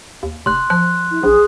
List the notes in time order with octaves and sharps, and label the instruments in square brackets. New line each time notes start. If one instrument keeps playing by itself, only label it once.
[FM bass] D#2
[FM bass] F1 [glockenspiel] C6 F#6
[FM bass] F3 [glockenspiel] F#6
[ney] E4
[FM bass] A#1 [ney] G#4